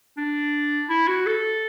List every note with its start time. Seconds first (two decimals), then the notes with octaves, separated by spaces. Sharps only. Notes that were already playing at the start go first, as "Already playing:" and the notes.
0.17 D4
0.89 E4
1.08 F#4
1.26 A4